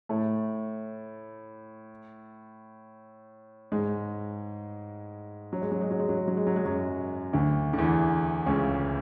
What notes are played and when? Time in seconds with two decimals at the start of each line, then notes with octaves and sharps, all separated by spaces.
0.09 A2 A3
3.72 G#2 G#3
5.53 F#3
5.62 G#3
5.72 F#3
5.81 G#3
5.91 F#3
5.99 G#3
6.09 F#3
6.18 G#3
6.28 F#3
6.37 G#3
6.47 F#3
6.56 G#3
6.65 F#2 F#3
7.33 D2 D3
7.73 D3
7.78 E2 E3
8.46 C#2 C#3